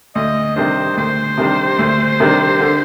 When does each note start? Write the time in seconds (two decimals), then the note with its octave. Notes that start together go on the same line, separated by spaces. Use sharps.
0.15 D2 D#5
0.56 C3 D#3 G3 D4 C5
0.97 D2 C5
1.37 C3 D#3 G3 D4
1.79 D2
2.20 C3 D#3 G3 D4
2.60 D3